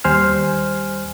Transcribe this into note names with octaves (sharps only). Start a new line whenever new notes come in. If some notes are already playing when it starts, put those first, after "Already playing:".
D#2 G3 C5 G#5 F6